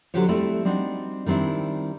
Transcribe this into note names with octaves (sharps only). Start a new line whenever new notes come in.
D3 F#3 F#4 G4 C5 C#5
G3 A3 C4 E4
G3 C4 D4 D#4 F#4
D#3 G3 C4 D4 E4